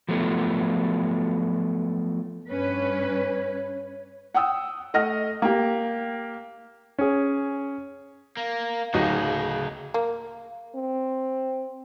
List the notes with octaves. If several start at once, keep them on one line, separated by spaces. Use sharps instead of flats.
F3 F#3 A3 B3
G2 C#4 B4 C#5
F#5 G5 D#6 E6
A3 D#5 F#5 F6 A#6
A#3 G4
C#4 G#4
A#3
D1 C#3 F#3 D#4 F#4
A#3
C4